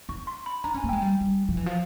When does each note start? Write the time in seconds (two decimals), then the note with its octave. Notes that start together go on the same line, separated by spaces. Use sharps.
0.09 D#4 C#6
0.27 C6
0.46 B5
0.64 D4 A#5
0.74 C#4 G#5
0.84 A#3
0.89 G#3 G5
1.02 G3
1.21 G3
1.49 F3
1.57 E3
1.66 F3